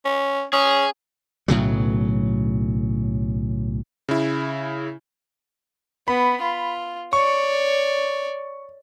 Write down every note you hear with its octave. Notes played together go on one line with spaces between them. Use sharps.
C#4
C#4 G#4
B1 A2 C#3 F#3
C#3 E4
B3 B5
F4
C#5 D5 C#6